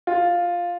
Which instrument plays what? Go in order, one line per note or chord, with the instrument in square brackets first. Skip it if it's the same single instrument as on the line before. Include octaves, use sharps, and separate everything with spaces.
[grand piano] F4